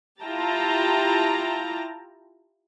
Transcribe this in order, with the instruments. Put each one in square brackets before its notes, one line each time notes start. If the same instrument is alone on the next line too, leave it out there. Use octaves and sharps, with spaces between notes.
[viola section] E4 F4 G4 G5 A5 A#5